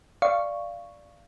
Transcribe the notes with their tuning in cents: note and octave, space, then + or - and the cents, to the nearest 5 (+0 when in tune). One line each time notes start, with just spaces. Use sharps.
D5 +0 F5 -15 C#6 +0